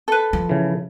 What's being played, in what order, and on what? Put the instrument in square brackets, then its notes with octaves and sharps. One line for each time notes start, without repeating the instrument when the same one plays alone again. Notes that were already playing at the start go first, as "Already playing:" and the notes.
[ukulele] A4 B4
[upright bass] F3
[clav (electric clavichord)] C#3 E3